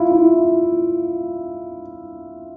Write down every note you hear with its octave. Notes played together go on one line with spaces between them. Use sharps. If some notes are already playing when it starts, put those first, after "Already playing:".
Already playing: E4 F4
E4